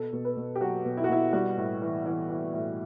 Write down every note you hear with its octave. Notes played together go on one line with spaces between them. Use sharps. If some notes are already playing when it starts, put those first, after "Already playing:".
Already playing: B2 A4
B2
B4
B2
G4
F#3 F#4
B2
E4
F#4
B2 E4
G3 F#4
A2
E3
E3
E3
A2